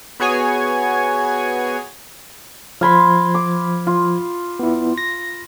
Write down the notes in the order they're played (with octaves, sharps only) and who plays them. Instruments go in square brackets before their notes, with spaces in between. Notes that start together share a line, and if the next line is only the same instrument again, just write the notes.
[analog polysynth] B3 F#4 G#4 C#5 G#5
[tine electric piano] F3 G#6 [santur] F5 B5 C6
[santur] D6
F4
[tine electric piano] B3 E4
A#6